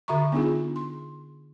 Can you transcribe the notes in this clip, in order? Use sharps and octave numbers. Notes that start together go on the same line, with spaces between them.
D3 F#4 E5 A#5 C#6
B3 D4 D#4 F4 G#4
C6